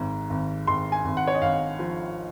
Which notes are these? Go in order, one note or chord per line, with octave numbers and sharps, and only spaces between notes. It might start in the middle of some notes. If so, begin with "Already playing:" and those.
Already playing: G#1 G#2
G#1
G#1 C6
G#5
G#1
F#5
C#5
D#5
G#1 F5
F3